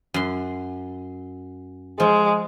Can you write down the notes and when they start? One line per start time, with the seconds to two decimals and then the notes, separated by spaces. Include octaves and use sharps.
0.14 F#2 C6
2.00 F3 G#3